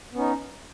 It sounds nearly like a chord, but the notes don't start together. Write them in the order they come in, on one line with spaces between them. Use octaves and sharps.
B3 C#4 D#4